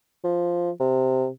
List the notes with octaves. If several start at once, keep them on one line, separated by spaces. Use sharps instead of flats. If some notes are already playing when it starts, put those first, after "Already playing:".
F3
C3